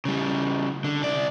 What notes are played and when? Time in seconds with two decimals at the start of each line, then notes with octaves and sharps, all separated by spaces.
0.05 C#3 G3
0.85 D3
1.02 C2 D5